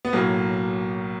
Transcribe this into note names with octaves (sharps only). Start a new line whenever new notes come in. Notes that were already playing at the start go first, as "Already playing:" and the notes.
B3
B1 A2 F#3 A#3